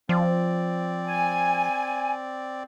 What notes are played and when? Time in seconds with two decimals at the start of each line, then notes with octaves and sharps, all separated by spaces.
0.09 F3 C4 D5
1.06 G#5